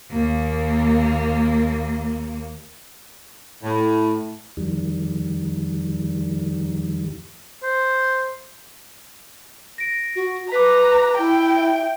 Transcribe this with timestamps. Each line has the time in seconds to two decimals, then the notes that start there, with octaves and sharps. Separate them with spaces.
0.11 D#2 A#3
3.63 A2
4.57 F2 D#3 G3
7.63 C5
9.78 A#6 D7
10.16 F#4
10.52 B4 A#5 D6 B6
11.19 E4 G5
11.55 E5